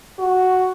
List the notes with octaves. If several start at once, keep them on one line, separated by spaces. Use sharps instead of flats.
F#4